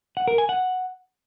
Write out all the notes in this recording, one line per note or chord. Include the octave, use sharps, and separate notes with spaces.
F#5
A#4
G#5
F#5